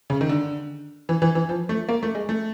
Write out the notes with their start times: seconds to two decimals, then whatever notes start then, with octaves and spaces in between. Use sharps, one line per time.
0.10 C#3
0.21 D#3
0.29 D3
1.09 E3
1.22 E3
1.35 E3
1.49 F3
1.69 A3
1.89 A#3
2.03 A3
2.15 G#3
2.29 A3